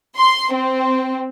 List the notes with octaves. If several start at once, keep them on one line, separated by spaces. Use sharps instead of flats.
C6
C4